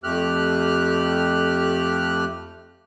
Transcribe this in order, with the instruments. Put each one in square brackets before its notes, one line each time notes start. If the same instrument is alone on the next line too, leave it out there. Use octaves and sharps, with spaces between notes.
[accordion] F2 A3 G4 F6 F#6